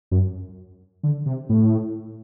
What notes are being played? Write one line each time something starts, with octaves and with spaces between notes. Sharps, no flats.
F#2
D3
C3
A2